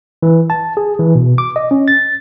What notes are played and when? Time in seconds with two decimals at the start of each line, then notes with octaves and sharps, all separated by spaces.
0.23 E3
0.50 A5
0.77 G#4
0.99 E3
1.15 B2
1.38 D6
1.56 D#5
1.71 C#4
1.88 A6